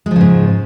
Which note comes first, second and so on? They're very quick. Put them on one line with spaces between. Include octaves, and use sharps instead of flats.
G#3 F3 C#3 G#2